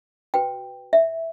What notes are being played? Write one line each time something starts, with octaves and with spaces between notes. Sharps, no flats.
F#4 B4 G5
E5